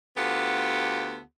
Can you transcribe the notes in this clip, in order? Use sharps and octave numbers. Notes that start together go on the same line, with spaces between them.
D2 B3 F4 G4 A4 F#5